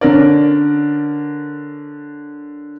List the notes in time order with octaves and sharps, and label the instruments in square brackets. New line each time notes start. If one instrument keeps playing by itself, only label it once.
[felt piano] D3 C#4 A#4 D5